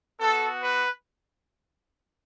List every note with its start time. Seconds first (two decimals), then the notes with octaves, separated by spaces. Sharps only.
0.19 B3 F#4 A4
0.60 B4